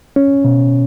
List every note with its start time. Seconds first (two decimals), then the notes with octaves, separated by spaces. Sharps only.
0.16 C#4
0.44 B2